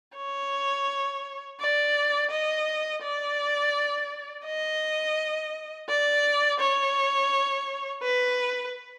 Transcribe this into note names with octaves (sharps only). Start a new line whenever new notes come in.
C#5
D5
D#5
D5
D#5
D5
C#5
B4